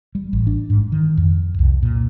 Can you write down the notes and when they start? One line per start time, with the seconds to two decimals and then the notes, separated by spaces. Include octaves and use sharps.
0.15 G3
0.33 A1
0.47 D4
0.70 G#2
0.92 D#3
1.17 F2
1.59 C2
1.83 A#2